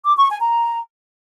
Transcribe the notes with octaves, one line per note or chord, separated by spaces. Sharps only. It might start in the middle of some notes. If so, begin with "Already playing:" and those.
D6
C#6
G#5
A#5